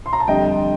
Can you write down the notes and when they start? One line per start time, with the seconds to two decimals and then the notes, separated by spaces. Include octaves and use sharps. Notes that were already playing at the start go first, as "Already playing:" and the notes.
0.06 C6
0.13 A#5
0.20 A5
0.28 F2 D3 G3 D#5 G5